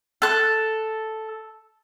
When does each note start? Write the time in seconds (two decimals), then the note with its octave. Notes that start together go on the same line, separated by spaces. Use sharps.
0.22 A4 F#6